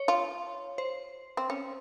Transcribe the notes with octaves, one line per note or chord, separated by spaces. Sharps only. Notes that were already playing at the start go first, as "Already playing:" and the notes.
Already playing: C#5
F4
C5
C4
C#4